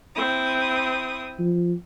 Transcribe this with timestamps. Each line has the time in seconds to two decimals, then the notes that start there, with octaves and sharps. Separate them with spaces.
0.16 C4 E4 D#6
1.39 F3